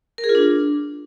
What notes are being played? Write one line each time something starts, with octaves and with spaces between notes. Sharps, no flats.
A#4
G#4
F4
D4